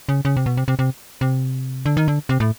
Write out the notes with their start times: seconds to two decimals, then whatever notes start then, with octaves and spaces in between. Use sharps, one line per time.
0.09 C#3
0.25 C#3
0.37 C3
0.46 B2
0.57 C3
0.68 C3
0.79 C3
1.21 C3
1.86 D3
1.97 D#3
2.08 D3
2.29 C3
2.40 A2